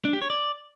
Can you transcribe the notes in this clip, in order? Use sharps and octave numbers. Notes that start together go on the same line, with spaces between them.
D4
G4
C#5
D5